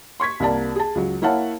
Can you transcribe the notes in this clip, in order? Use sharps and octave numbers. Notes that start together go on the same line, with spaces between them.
C6 C#6 G#6 B6
C2 A#3 D5 A5
G#4 A5
C#2 F#3
A#3 E4 C#5 F5 F#5 A5